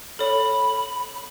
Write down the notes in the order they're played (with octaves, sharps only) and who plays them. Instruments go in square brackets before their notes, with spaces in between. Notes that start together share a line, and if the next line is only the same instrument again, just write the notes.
[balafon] A4 C#5 [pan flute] B5